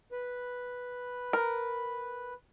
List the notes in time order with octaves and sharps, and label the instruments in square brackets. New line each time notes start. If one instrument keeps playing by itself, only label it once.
[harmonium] B4
[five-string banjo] A#4